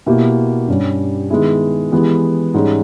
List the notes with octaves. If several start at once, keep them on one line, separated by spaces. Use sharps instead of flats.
B2 A#3 E4 G4
G2 G3 C#4
D#3 G#3 B3 E4 G#4
E3 G#3 B3 G4
G#2 G3 C#4 G#4